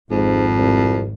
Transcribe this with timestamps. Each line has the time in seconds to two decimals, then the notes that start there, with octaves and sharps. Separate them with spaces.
0.11 G#1 F2 G#2
0.58 C2